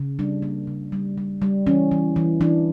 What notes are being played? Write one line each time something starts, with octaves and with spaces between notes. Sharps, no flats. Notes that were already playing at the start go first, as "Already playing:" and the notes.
Already playing: C#3
G3 D4
A#3
C#3
G3
G3
G3
E3 C#4
E3
E3
E3 D4